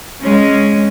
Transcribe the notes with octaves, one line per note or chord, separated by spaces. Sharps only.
G#3 C#4